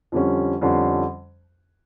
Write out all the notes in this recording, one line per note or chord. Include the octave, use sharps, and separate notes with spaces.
F2 D3 G3 C#4
F2 D3 G3 C#4